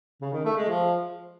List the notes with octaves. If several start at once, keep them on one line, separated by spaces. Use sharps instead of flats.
C#3
D#3
A3
G#3
F3